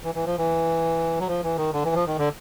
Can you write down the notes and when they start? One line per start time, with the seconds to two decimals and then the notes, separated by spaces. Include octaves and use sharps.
0.04 E3
0.15 E3
0.26 F3
0.38 E3
1.19 F#3
1.28 F3
1.43 E3
1.57 D#3
1.73 D3
1.84 E3
1.95 F3
2.07 D#3
2.18 D3